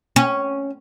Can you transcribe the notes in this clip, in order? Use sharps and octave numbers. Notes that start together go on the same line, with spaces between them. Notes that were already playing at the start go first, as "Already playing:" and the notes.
C#4